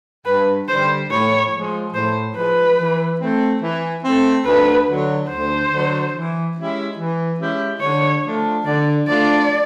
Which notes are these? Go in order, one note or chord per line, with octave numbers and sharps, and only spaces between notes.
G2 B4
D3 G3 C5
A2 C#5
F3 G#3
A2 C5
F3 G#3 B4
E3
A3 C4
E3
A3 C4
D2 B4
D3 F#3
D2 C5
D3 F#3
E3
G#3 C#4 E4 G4
E3
G#3 C#4 E4 G4
D3 C#5
F3 A3 D4 F4
D3 D5
F3 A3 D4 F4 D5